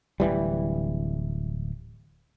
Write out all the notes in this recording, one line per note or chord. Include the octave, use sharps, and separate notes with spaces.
D1 A#1 E3 G3